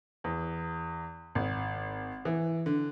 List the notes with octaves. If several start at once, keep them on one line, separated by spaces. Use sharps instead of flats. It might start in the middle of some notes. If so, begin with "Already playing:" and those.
E2
G#1
E3
D3